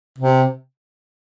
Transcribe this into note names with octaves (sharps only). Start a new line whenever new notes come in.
C3